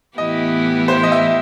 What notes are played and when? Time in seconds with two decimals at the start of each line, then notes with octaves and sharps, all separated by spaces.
0.18 A2 E3 B3 E4 G4 D#5
0.88 C5
1.03 D#5
1.12 E5